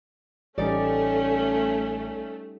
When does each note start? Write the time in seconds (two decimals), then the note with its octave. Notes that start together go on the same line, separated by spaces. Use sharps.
0.58 A1 G3 A3 C#4 D#4 D5